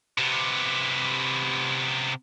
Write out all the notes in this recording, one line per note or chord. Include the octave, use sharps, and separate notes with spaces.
C3 B3